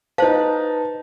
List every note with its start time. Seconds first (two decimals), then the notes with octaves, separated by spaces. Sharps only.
0.18 D#4 B4 C5 F5 A5